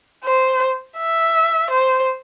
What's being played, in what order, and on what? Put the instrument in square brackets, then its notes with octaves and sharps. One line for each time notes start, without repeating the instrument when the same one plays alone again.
[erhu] C5
E5
C5